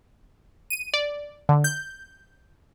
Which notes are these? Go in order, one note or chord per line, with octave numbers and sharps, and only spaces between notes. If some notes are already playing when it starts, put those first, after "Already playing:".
D#7
D5
D3
G6